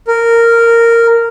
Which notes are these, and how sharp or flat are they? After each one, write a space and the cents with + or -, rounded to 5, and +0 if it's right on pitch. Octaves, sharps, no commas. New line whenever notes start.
A#4 -10